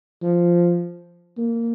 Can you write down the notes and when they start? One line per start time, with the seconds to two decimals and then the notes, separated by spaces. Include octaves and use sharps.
0.22 F3
1.38 A#3